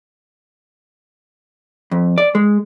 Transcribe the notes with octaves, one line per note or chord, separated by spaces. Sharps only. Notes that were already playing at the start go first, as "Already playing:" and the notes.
F2
D5
G#3